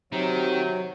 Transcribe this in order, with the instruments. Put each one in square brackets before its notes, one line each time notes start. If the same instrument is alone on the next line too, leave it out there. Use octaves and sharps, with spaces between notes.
[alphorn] C3 [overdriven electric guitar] D#3 [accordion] F#3